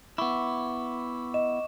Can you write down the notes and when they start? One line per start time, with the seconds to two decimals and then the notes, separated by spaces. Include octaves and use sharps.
0.18 B3 E4 C#6 D6
1.34 D#5 E7